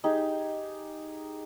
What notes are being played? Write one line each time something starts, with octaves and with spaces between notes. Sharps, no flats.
D#4 G4 G#4